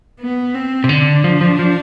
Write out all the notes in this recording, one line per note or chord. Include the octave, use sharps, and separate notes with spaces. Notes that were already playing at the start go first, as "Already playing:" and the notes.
B3
C4
C3
D3 D4
F3
F3
F3